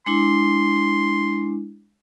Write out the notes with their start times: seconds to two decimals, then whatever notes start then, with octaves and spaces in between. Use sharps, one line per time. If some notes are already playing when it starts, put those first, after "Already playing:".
0.06 G#3 D4 E4 C6